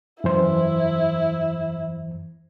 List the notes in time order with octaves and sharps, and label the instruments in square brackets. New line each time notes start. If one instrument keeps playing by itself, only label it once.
[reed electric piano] F#2 E3 C5 [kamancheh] E4